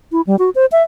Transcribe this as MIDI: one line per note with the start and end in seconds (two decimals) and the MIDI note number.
0.12 0.21 64
0.27 0.36 55
0.39 0.50 66
0.55 0.66 72
0.72 0.83 76